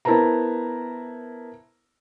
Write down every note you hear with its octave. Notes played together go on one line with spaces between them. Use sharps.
B3 E4 A#4 C5 A5 A#5